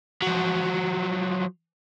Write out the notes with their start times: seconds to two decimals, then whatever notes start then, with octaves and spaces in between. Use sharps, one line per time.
0.22 F3 F#3